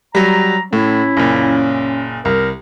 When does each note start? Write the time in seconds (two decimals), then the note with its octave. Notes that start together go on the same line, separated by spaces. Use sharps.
0.15 F#3 G3 A#5
0.73 A2 C#4 E4
1.17 F#1 A#2
2.25 C2 A#4